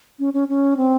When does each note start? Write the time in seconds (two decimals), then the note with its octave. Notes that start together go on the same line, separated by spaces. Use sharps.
0.19 C#4
0.34 C#4
0.48 C#4
0.77 C4